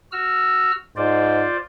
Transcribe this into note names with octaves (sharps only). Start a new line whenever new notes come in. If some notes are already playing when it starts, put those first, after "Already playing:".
F#4 E6 F6
G#2 F4 C5 D5